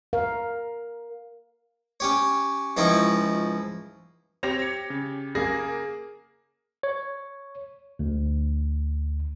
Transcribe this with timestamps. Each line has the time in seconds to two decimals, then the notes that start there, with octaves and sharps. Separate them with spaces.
0.13 A#4 F5
2.00 C#4 G4 C#5
2.77 C#2 F3 D#4 E4 G5 C#6
4.43 C4 G4 C5 C#5 A#6 F7
4.59 G#6 C#7
4.90 C#3
5.35 A#3 G#4 A#6
6.83 C#5
7.99 D2